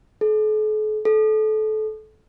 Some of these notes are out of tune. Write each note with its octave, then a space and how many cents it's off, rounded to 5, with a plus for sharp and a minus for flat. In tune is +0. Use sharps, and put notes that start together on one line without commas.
A4 -45
A4 -25